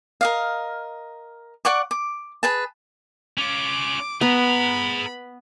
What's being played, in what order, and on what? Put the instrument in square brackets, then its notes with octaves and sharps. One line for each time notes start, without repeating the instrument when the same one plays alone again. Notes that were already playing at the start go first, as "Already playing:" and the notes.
[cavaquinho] A#4 D#5 F5
D5 F#5 C#6 D6
D6
G#4 B4 A5
[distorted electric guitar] C#4 F4 [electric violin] D6
[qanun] B3 [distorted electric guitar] G#4 A#5 [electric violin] B5